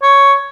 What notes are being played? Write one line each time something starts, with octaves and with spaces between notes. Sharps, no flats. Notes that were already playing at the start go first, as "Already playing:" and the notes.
C#5